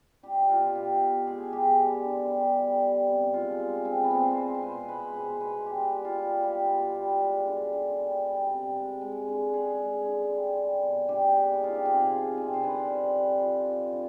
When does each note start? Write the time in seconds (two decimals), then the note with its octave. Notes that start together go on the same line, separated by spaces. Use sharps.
0.23 G3 G4
0.42 G4
0.49 B2 F4
0.75 B2 G4
1.01 B2
1.27 G#3 G#4
1.53 B2 G4
1.79 G3
2.04 D3
2.30 G3
2.56 G3
2.82 G3
3.08 C3
3.33 G#3 F4
3.59 G#3
3.85 D3 C4
4.04 B3
4.11 G#3 C4
4.31 C5
4.37 G#3 B4
4.54 C5
4.62 B2 B4
4.80 C5
4.88 G#3 B4
5.14 B2 C5
5.41 B2 B4
5.66 G3 G4
5.92 G3
6.05 F4
6.17 G3
6.43 G3 G4
6.70 B2
6.95 G3
7.22 G#3
7.46 D3
7.73 D3
7.98 G3
8.24 G3
8.50 C3
8.76 G#3
9.01 G#3
9.28 D3
9.53 G#3 G#4
9.79 G#3
10.05 D3
10.31 G3
10.56 G3
10.82 B2
11.09 D3 G4
11.34 G#3
11.53 D#4
11.60 F3 F4
11.75 G4
11.85 C3 G#4
12.12 G3
12.38 C3
12.53 C5
12.63 D3 B4
12.89 G3
13.15 G3
13.41 F3
13.67 F3
13.93 D3